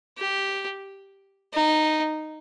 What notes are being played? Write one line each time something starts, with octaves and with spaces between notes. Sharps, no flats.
G4
D#4